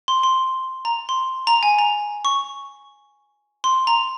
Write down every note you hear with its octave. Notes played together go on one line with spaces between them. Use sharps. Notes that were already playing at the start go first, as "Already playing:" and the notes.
C6
C6
A#5
C6
A#5
G#5
A#5
C#6
C6
A#5